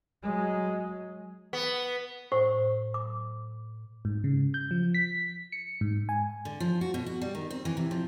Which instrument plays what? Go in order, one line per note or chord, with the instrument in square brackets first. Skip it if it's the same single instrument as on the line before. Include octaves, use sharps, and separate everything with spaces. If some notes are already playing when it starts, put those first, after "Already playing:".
[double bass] F#3 G#3
[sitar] B3
[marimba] A2 [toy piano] C5
[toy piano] D6
[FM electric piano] G#2
C#3
G6
F3
B6
C#7
G#2
G#5
[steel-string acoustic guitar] D3
F3
F#4
B2
F#4
G3
D#3
C4
E3
C3
F3